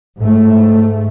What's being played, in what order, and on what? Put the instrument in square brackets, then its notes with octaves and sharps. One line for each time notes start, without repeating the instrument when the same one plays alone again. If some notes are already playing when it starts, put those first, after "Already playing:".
[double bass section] G#2 A3